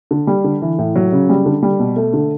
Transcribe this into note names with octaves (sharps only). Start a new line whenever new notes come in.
D3
G3
D3
E3
A2
F#3
C#3
G3
D3
G3
B2
A3
D3